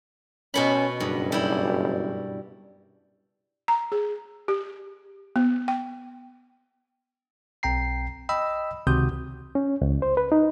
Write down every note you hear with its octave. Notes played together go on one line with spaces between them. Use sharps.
B2 B3 C#4 B5
F#1 G2
G3 E4
A#5
G#4
G4
B3
G5
B1 C4 G5 A#5 C7
D#5 G5 B5 E6
C#2 C3 D#3 F#4 D#6 G6
C#4
C#2
C5
B4
D#4